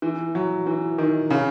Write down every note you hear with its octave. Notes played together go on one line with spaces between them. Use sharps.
E3
F#3
E3
D#3
C#3